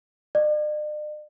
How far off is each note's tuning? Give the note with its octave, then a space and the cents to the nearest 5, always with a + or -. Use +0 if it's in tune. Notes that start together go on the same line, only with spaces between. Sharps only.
D5 +45